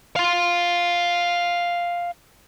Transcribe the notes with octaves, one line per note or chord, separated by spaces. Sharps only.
F5 C6